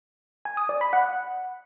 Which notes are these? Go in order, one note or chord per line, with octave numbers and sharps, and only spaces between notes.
G#5
D#6
D5
B5
F#5